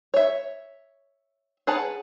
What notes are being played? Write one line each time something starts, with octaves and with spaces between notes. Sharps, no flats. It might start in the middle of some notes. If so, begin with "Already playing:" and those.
C#5 E5
G#4 B4 F#5 A5 A#5